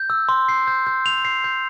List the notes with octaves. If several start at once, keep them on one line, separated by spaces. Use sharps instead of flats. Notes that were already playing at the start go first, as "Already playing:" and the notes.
Already playing: G6
E6
C6
C7
G6
G6
F7
C7
G6